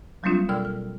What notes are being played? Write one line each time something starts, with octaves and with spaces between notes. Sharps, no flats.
F#3 G3 A#3 C4 D4 F4
B2 A#4 D5 G5 E6 F6
F6